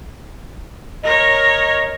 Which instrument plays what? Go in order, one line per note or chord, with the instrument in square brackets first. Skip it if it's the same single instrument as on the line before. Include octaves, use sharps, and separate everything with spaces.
[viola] A#4 C#5 [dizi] D#5